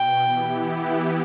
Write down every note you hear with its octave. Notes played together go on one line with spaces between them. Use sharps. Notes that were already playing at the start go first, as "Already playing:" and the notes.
Already playing: B2 G5
E3 B3 E4 G4